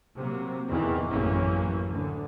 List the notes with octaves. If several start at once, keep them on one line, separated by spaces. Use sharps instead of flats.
C3 F#3 A#3
E2 D#3 E3
A1 F#2 E3 A#3 C#4
D2 D3